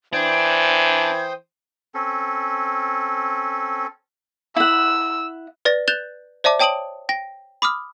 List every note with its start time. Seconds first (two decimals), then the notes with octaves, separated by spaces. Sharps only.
0.13 E3 D4 C5 G5 D#6 G#6
1.94 C4 C#4 A4
4.56 E4 F#5 E6
5.65 B4 D5 A6 A#6
5.88 F#6 G6 A6 E7 F7 G7
6.44 C5 D5 E5 A5 D6
6.59 C#5 G5 A5 D#6 D7 F#7
7.09 G5 A#6
7.62 B5 D6 D#6 F6